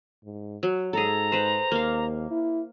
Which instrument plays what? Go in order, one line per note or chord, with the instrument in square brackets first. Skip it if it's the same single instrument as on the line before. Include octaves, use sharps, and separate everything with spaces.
[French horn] G#2
[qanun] F#3 [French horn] F#4
[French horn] G#2 [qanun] G#4 A4 [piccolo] A#5
[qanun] B4 C5
[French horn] D#2 [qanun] A#3 F5
[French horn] E4